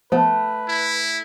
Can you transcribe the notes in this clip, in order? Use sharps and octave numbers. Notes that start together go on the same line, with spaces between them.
F3 A3 B3 B4
E4